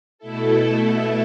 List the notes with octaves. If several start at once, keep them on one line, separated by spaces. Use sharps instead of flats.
B2 A3 E4 A4